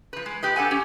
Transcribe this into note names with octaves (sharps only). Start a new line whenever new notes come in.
F3 B4
G#3
G4 B4 D#5
D4 A4 F#5 G#5
C#4 G4